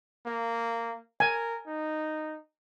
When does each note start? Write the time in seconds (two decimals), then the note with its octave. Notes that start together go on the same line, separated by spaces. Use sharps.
0.26 A#3
1.20 A#4 G#5
1.67 D#4